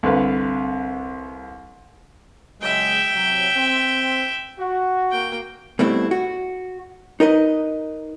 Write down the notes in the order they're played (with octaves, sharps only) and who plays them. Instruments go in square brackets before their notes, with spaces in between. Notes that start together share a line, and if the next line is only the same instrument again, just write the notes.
[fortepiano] C2 D3 B4 F5
[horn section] C#3 F#3 G#3 [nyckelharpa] E5 G5
[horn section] C3 F#3
C4
F#4
[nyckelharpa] A#3 G5
[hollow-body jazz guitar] B2 G3 A3 C4 E4
F#4
D#4 A#4 B4 D#5